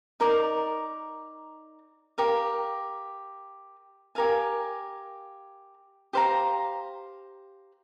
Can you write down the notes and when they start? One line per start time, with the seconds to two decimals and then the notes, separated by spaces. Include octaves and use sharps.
0.20 D#4 A#4 D5
2.18 G4 A#4 F5
4.15 G4 A#4 F5 G#5
6.13 G4 C5 F5 A#5